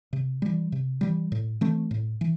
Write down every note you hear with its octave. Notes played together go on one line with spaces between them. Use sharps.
C3
E3 G3
C3
E3 G3
A2
E3 A3 C4
A2
E3